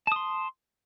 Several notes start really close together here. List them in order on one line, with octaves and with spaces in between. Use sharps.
A5 D#6 C6